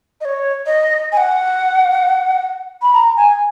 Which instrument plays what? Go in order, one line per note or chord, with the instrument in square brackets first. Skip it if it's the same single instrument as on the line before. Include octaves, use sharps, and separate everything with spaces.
[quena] D#5
C#5
D#5
G#5
F#5
B5
A#5
G#5